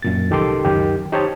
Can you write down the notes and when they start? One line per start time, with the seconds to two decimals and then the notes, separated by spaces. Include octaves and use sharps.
0.02 F#2 A#2 A6
0.30 C2 D#3 G4 A4 C6 D6
0.65 C#2 F#2 D#3 G4
1.12 D#4 G4 C5 C#5 D#5 A5